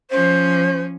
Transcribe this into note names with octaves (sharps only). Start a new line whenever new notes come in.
F3 C#4 C5